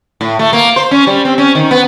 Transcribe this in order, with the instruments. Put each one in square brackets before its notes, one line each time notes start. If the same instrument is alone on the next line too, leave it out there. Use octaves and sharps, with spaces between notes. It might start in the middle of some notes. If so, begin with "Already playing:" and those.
[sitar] A2
A3
A#3
C5
C#4
G3
C4
C#4
D#3
B3